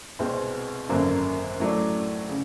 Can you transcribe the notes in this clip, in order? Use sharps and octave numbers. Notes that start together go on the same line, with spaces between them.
C2 B2 G#3 C4
G#1 F#2 D3 F#3 A#3
A2 F#3 A3 D4
C#3